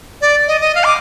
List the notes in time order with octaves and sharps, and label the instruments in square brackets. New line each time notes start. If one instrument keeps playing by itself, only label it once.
[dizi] D5
D#5
D#5
F5
D6